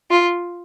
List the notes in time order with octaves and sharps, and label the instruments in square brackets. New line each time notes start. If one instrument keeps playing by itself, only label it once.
[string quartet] F4